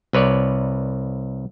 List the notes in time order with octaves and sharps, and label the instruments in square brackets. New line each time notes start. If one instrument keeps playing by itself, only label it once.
[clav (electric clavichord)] C2 B4 C#5 D5